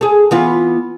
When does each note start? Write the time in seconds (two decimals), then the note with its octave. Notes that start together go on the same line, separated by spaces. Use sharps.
0.01 G#4 A4
0.31 E3 B3 F4